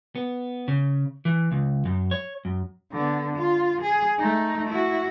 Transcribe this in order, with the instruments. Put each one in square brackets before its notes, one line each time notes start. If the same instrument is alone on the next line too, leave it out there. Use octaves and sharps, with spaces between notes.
[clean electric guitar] B3
C#3
E3
C#2
F#2
C#5
F#2
[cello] D3 B3
F4
G#4
A3 D#4
E4 F#4